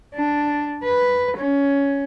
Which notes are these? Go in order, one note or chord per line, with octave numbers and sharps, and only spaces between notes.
D4
B4
C#4